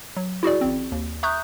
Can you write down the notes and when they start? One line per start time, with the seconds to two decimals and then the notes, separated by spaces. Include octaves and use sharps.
0.16 F#3
0.43 E4 F#4 G#4 D5
0.61 A1 C4
0.92 D#2
1.23 E5 A#5 C#6 D#6 F#6 G6